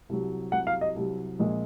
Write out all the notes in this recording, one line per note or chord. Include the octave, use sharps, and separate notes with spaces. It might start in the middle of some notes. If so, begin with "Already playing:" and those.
C2 C3 F#3
C2 C3 F#3 F#5
F5
D#5
C2 C3 F#3
A#1 A#2 G#3